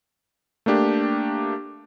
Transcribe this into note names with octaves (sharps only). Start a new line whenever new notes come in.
A3 A#3 D4 G4